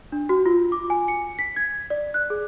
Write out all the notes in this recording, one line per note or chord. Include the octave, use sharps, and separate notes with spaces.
D4
F#4
F4
D6
G#5
C#7
B6
G#6
D5
F#6
G#4